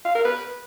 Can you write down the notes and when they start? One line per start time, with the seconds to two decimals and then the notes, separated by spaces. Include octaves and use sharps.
0.05 F5
0.15 A#4
0.25 B4